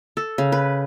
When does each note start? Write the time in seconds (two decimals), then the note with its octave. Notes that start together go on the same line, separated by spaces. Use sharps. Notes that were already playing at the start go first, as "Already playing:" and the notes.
0.17 A4
0.38 C#3
0.52 B4